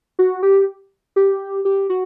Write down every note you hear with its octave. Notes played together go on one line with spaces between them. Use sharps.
F#4
G4
G4
G4
F#4